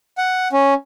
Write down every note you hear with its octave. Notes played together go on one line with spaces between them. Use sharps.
F#5
C#4